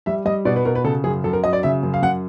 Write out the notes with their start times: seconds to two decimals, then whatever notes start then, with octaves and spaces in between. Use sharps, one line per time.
0.06 G3 E5
0.25 G3 D#5
0.45 B2 D5
0.56 B4
0.65 B2 A#4
0.75 B4
0.84 C#3 A4
1.04 F#2 G#4
1.24 F#2 A4
1.33 A#4
1.44 F#3 D#5
1.53 D5
1.63 C#3 E5
1.83 F#2
1.94 F5
2.02 F#2 F#5